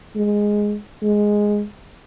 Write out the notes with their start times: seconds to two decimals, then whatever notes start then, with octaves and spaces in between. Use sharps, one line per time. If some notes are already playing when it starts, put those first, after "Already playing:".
0.16 G#3
1.02 G#3